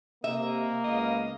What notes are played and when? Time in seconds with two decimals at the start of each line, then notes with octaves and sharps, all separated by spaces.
0.24 C3 A#3 D#5 E5
0.84 C#2 B3 D#5 F5